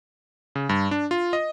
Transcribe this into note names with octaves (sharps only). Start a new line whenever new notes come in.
C#3
G2
D4
F4
D#5